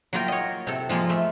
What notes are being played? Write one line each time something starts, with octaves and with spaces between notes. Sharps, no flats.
F#3 A#3 F4 A#4 G5
C#5 D#5
C3 A4
F3 G#3 A#3 F4
A3 E5